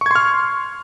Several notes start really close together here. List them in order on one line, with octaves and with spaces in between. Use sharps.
C#6 G#6 C6 F6